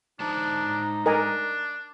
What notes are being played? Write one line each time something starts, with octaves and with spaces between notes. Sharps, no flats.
G#3 D4 D#4 C5 A5
D4 A#4 D#5 G#5